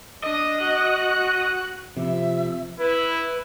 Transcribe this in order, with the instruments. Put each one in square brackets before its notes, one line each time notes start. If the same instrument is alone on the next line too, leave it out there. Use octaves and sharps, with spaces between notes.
[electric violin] D4 D#6 [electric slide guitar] D#5
[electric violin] F#4 F#6
[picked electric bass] C3 [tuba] F3 [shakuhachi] E5
[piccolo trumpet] E4 [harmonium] B4